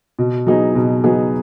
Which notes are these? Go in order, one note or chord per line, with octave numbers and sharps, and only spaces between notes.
B2
F#3 B3 D#4 G#4
B2
F#3 B3 D#4 G#4